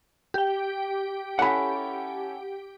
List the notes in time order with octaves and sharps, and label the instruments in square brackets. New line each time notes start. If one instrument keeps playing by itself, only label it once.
[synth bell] G4 G5
[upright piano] C#4 E4 A4 [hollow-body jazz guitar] F#5 B5